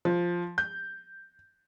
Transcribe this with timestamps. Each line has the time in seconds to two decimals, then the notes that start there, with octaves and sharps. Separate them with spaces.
0.05 F3
0.58 G6